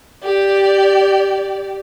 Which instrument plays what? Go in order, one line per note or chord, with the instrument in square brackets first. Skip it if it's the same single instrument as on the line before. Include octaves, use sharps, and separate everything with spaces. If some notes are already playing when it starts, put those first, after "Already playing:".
[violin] G4 D5